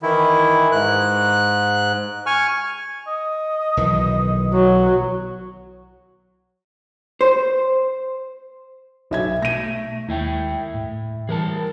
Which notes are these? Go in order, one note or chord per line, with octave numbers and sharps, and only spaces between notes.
D#3 E3 E4
G#2 F#6
G#5 C#6 F6
D#5
B1 D#3 E3
F#3
C5
B1 B2 E5 G#6
A3 A#6 D#7
D#2 E4 E5 G5
A2
E3 G3 G#4 A#4 A5